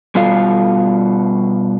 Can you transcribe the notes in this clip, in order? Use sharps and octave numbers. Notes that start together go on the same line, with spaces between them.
B2 G3 F4 A4 F5